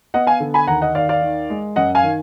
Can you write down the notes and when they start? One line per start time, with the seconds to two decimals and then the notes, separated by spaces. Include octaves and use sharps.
0.14 B3 D#5 F#5
0.27 F5 G#5
0.40 D3
0.54 G#5 B5
0.67 D#2 F#5 A#5
0.82 D#5 F#5
0.95 D#2 D5 F5
1.09 D5 F5
1.22 D#3
1.50 G#3
1.76 F#2 D#5 F#5
1.95 F5 G#5
2.03 D#3